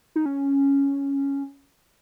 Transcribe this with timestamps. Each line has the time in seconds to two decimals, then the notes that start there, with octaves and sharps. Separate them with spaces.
0.16 D#4
0.26 C#4